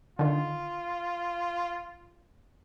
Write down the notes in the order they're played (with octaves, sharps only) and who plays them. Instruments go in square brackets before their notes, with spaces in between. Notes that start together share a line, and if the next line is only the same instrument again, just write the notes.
[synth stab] D3 D#3 [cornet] F4